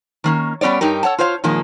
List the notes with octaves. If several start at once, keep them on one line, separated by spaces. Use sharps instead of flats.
D#3 A#3 C#4
G3 B3 C#4 C#5 D5
G2 D#4 G4 A#4
A4 C#5 F#5 A5
F4 C5 C#5 F5
A#2 D#3 F3 G#3 A#3